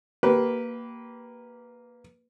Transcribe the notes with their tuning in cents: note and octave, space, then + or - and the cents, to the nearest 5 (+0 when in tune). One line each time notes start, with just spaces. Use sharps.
A#3 +0 G4 -20 B4 -5